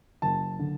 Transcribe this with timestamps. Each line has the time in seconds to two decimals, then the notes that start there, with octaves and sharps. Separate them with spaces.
0.22 F#1 A5
0.59 D3